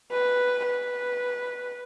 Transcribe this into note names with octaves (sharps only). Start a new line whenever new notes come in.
B4
B4